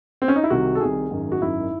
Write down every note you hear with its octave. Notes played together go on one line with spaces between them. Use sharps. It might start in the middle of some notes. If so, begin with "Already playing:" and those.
C4
C#4
D#4
E4
C2 C3 D#3 F#4
A4
C2 C3 D#3 G#4
G#1 F#2 D#3
F#4
G#1 F#2 D#3 E4